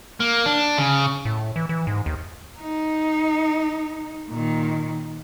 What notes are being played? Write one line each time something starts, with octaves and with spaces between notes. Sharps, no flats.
A#3
D4
C#3
A2
E3
E3
G#2
D#2
D#4
A#2 D#3